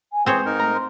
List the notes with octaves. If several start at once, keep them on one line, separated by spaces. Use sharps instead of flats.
G#5
E3 G#3 C4 G#4 C5 C#5
G#2 D#4 A#4
A3 A#5
C6